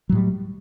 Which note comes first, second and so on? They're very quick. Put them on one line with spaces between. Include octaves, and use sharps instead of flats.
F#3 A2 G3